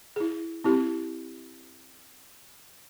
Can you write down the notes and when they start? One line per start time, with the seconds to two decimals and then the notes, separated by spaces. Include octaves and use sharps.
0.16 E4 G#4
0.64 C4 E4 G4